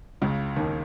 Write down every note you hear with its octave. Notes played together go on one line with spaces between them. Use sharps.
C#2 C#3
D#2 D#3